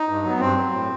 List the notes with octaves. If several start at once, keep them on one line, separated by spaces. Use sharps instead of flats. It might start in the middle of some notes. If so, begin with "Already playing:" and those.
Already playing: D#4
G2
F#3 B3
G2 C4
F#3
A2